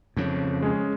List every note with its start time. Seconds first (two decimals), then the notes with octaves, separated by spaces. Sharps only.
0.17 F2 C#3
0.62 G#3 C#4 G#4